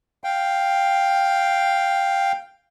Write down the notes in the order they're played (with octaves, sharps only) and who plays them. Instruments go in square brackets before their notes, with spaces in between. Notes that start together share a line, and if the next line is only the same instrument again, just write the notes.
[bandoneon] F5 G5